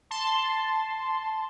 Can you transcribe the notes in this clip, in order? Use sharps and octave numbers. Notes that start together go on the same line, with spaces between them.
A5 C6